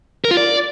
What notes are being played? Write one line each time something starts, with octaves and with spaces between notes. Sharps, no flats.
A#4
F4
D5